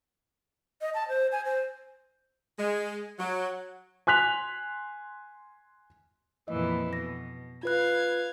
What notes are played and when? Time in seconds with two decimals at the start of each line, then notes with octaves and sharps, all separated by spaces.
0.81 D#5
0.94 A5
1.08 C5
1.32 G#5
1.45 C5
2.58 G#3
3.19 F#3
4.07 G#5 C6 F#6 B6 F7
6.48 F2 A#2 E3 D#5
6.93 B2 A#6
7.63 F4 B4 F5 F#6 G#6